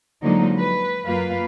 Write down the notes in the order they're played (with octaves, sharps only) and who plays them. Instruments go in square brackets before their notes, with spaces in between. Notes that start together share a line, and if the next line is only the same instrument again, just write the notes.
[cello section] D3 F3 F#3 G#3 A#3 D#4
B4
F#2 A#3 F4 B4 F5